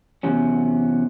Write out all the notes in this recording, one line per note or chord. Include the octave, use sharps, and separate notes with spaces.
E2 C3 F#3 C#4